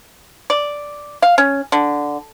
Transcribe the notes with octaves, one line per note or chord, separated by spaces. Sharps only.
D5
F5
C#4
D3